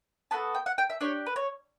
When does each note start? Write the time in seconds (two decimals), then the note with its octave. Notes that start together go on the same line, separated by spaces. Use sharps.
0.31 B3 F#4 A4 A5
0.55 G5
0.66 F#5
0.78 G5
0.90 E5
1.01 D4 G4 C#5
1.26 B4
1.36 C#5